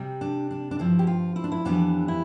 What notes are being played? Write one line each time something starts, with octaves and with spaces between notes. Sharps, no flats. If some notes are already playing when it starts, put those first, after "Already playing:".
Already playing: C3 G3
D4
D4
D4
G2 F3 C4 E4
G4
F4
E4
D4
E4
F2 E3 G3 B3 D4
E4